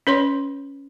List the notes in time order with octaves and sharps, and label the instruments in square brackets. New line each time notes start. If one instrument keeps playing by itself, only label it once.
[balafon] C#4 B4 C#5 C6